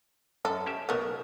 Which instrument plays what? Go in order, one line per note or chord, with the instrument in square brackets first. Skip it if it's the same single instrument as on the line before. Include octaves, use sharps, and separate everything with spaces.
[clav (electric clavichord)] F#2 [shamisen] A4
[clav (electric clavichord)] C#4 G4 E5
[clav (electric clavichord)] B1 F#3 A3 [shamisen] B3 A#4